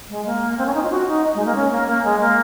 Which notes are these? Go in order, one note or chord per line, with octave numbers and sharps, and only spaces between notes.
G#3
A#3
C4
C#4
D#4
F4
F#4
D#4
G#3
A#3
C#4
A#3
A#3
G#3
A#3